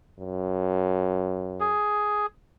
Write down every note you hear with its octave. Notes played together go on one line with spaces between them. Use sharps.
F#2
G#4